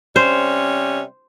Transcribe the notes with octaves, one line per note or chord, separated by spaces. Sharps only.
C3 G3 C#4 C5